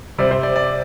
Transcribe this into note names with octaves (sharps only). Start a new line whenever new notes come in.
C3 G3 C4 D5
C5
D5
D5